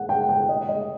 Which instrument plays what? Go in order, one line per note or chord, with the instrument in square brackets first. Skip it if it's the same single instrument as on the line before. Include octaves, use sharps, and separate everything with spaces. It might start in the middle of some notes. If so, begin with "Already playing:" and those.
Already playing: [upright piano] F#5
G5
G5
D#5
D#5